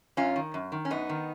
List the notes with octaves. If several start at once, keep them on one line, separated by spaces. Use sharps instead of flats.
F#2 C#4 F4
D#3
F#2
D#3
C#4
F#2 B3 D#4
D#3